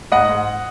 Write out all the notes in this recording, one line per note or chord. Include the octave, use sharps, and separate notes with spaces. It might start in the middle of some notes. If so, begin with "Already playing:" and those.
G#2 D#5 F#5
G#2